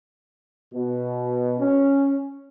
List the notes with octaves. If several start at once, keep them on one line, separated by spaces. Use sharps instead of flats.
B2
C#4